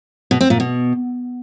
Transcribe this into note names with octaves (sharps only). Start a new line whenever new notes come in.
B2
C4
A#2
B2